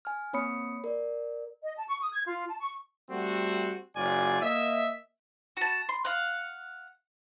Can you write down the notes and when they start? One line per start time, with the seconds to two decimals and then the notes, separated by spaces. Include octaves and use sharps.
0.05 G#5 F6
0.33 A#3 C4 C#5 B5 D#6 C#7
0.84 A#4 D5
1.62 D#5
1.76 A5
1.88 C#6
2.01 D#6
2.13 G#6
2.26 F4
2.48 A5
2.61 C#6
3.10 G3 A3 C4 F#4
3.96 F#1 F#3 F4 D5 G#5
4.42 A#3 D#5 E5
5.57 F#4 A5
5.89 C6
6.05 F5 F#5